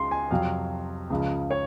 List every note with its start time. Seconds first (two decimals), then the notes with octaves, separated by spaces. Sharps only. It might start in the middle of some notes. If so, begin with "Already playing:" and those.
Already playing: C#2 C#3 C6
0.11 G#5
0.31 F2 C3 F#3 F5
1.10 C#2 C#3 F3
1.51 C#5